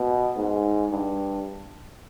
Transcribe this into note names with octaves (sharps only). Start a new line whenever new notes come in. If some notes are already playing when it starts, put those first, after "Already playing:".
Already playing: B2
G#2
G2